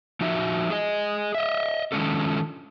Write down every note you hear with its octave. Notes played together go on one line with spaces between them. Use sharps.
F3 D#4 F#4 E5
G#4 D#5
D#5 E5
D#3 F3 G#3 C#4 D4 A4